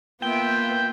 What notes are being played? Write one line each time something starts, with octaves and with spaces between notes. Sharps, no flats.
A#3 B3 F4 E5 G5